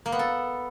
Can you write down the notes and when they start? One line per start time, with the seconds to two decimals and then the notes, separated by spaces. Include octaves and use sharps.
0.06 A#3
0.12 B3
0.19 A4